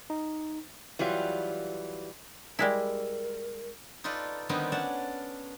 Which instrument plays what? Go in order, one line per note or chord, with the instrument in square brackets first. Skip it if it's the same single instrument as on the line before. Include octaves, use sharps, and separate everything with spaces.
[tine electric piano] D#4
[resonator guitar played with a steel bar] E3 F#3 G3 F4
[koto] G3 G#3 E4 [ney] A#4
[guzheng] D#4 F4 A4 B4 D5
D3 D#3 G3 B3 C4 D#4
C#4 D4 D5 F#5 A5